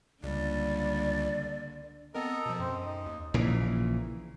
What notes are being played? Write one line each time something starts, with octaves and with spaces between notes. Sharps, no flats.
C#2 D3 G3 A#3 D5
B3 C4 A4 A#4 D#5 A#5
B2 F3
F#2 C4
D#4
D#2
A#1 A#2 C#3 E3